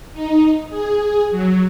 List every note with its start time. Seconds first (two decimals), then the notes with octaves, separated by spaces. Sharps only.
0.13 D#4
0.70 G#4
1.31 F#3